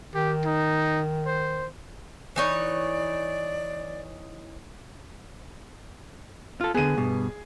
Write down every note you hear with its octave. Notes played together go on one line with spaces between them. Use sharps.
D#3 G4
D#4
C5
E3 D#4 C#5 D5
F4 A4
D3 B3 G#4 D#7
G2 B2